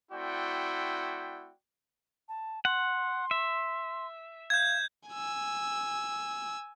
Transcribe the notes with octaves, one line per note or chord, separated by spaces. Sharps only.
A3 C4 E4 F#4 D5 G5
A5
F#5 C6
E5
F5 G6 G#6
G#5 E6